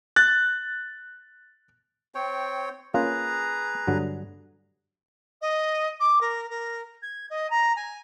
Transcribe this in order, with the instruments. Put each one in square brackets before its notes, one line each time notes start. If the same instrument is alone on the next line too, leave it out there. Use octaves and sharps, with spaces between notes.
[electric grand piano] F#6 A6
[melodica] C4 C#5 G5
[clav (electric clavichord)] A#3 C#4 F4 [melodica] G#4 B4 A#5
[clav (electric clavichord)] G2 D3 F#3
[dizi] D#5
D6
A#4
A#4
G#6
D#5
A#5
G#5